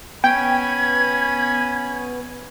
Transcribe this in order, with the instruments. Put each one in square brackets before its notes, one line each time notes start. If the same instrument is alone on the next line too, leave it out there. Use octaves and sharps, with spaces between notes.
[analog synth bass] B3 [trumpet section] C#4 G#5 B5 [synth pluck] G5 [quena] G#6